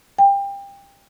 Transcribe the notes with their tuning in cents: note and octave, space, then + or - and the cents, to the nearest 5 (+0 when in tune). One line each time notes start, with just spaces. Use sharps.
G5 +25